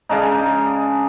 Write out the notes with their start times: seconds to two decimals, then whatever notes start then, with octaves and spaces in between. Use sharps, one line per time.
0.09 C#3 G#3 D4 D#4